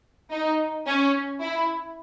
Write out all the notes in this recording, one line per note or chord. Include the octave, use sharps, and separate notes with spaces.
D#4
C#4
E4